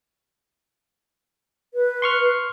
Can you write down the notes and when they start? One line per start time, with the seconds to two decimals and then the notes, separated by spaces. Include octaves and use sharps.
1.74 B4
2.02 C6 C#6 F6